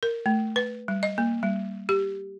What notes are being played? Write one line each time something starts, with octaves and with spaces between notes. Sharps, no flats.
A#4
A3
B4
G3
D#5
A#3
G3
G4